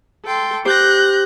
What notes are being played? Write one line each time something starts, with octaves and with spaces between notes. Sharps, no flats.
A4 G5 C6
G4 C5 F#6 G6 A#6